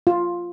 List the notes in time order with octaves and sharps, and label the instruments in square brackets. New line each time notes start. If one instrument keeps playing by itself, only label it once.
[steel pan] F4